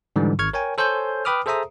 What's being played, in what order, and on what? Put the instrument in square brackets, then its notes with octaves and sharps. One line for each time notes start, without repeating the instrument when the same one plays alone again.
[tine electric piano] G#2 D3 E3 G3
G#1 C#6 F6 G#6
A#4 C#5 G5 G#5
A4 C5 C#5 G#5 G6
B4 G5 B5 D6 D#6 F6
G#4 A4 C5 E5 A#5 D#6